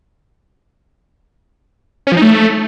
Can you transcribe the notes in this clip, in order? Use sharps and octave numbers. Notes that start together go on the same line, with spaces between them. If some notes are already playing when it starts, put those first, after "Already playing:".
C#4
F3
D#4
A3